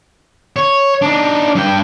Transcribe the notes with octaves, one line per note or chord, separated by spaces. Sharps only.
C#5
D4 D#4
G2 G5